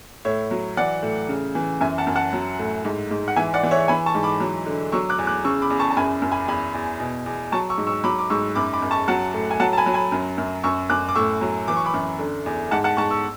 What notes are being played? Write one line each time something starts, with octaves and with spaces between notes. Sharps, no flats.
A2 C#5 E5
F#3
E3 D5 F#5
A2
C#3
E3
F#2 E5 G#5
F#5 A5
F#2
F#5 A5
F#3
A2
G#2
G#2
F#5
E3 E5 G#5
D5 F#5
E3
C#5 E5
E3 G#5 B5
A5 C#6
G#2
B5 D6
F#3
D3
F#3 C#6 E6
D6 F#6
E2
D6 F#6
C#3 C#6 E6
B5 D6
E2
A5 C#6
A5
F#2 G#5 B5
F#2
G#5 B5
E2 G#5 B5
E2
B2
E2
F#3 A5 C#6
C#6 E6
G#2
C#6 E6
F#3 B5 D6
D6
G#2 C#6 E6
F#2 B5 D6
B5 D6
F#2
A5 C#6
F#3 F#5 A5
A2
G#5
F#3 F#5 A5
A5
G#5 B5
F#3
G#5 B5
F#2
F#2
F#2 C#6 E6
F#2 D6 F#6
D6
A2 C#6 E6
F#3
E3 D6
C#6
B5 D6
F#2
D3
E2
G#2 F#5 A5
F#5 A5
G#2 A5 C#6
C#6 E6